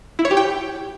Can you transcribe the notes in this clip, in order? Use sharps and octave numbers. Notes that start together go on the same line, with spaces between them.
E4
C#5
G4
G5